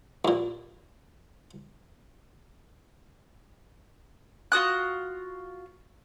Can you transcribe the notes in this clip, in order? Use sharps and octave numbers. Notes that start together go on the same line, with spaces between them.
D#2 A#2
F4 F#4 D#6 F#6